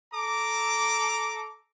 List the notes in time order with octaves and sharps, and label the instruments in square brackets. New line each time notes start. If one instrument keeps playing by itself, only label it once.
[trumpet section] A4 A#5 D6